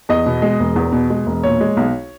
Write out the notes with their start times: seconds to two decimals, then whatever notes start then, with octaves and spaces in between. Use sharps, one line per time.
0.09 E2 D#5
0.26 B2
0.42 G#3
0.60 E1
0.76 E2
0.92 B2
1.10 G#3
1.26 E1
1.43 A#2 C#5
1.61 G#3
1.77 B1